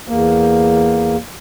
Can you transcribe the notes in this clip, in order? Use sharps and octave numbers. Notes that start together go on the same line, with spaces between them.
E2 A#3